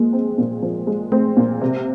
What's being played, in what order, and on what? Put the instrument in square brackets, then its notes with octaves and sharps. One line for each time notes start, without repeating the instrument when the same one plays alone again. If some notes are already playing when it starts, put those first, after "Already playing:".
Already playing: [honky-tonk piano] F3 G#3 [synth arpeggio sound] A#3
[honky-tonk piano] C4
A#2
F3
G#3
[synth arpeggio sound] A3 [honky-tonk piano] C4
[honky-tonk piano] A#2
C3